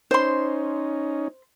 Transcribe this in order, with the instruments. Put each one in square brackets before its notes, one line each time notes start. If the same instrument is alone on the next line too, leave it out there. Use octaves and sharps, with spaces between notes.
[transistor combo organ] C#4 D#4 [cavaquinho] C5 C6